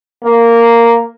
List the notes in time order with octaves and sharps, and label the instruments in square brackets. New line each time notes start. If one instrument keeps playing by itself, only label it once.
[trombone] A#3